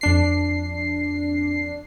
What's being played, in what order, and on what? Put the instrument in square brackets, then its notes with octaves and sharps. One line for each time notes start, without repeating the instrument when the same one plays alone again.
[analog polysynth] F2 D4 C7